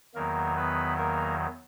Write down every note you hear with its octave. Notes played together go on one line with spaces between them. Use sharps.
E2 D#3 F#3 A#3 A#4
B3 B4
A#3 A#4